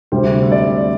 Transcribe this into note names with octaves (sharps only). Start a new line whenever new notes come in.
D2 C3 G3 C5
E5
D5